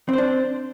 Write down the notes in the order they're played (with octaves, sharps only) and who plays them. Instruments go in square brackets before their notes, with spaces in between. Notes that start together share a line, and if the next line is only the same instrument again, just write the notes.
[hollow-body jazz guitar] C4
C5
D4